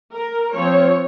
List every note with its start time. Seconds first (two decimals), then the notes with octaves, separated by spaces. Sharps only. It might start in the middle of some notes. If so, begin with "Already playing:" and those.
0.13 A#4
0.54 F3 C4 C#5